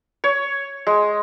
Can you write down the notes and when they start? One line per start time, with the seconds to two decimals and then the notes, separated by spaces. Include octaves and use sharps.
0.24 C#5
0.87 G#3